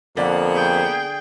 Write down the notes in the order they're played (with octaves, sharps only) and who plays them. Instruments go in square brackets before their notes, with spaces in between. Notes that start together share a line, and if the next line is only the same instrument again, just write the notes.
[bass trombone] F2 [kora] D3 D5 [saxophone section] A#3 B3
[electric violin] G#4 G5